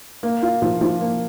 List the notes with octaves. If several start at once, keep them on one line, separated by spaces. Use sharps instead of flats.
A#3
F4
F3
F3
A#3